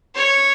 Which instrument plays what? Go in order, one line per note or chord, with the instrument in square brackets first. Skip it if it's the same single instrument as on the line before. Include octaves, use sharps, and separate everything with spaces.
[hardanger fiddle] C#5